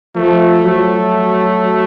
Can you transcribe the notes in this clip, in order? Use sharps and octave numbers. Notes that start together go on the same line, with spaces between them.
F3 A3
F#3